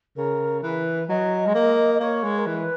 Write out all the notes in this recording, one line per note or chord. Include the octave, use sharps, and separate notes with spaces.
C#3 A#4
E3 B4
F#3 D#5
G#3
A#3
D#5
A#3 C#5
G#3
A#4
E3 B4